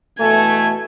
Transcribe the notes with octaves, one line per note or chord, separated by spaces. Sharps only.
B2 E3 A3 G#5